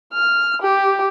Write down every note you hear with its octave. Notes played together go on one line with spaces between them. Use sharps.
F6
G4